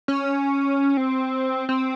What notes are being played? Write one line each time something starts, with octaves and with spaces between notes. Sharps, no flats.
C#4
C4
C4